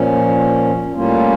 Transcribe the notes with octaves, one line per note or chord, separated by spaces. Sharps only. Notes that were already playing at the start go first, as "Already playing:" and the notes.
Already playing: A#2 F3 C#4
A2 G3 A#3 C#4 F4